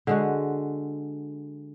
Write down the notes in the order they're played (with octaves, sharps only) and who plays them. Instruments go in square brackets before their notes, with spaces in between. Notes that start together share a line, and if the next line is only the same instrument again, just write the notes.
[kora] D3 G#3 F#4